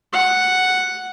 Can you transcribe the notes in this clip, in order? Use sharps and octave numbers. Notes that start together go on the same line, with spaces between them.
F#5